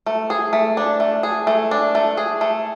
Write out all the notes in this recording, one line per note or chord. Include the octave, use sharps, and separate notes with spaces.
A3
G#4
A3
D4
A3
G#4
A3
D4
A3
G#4
A3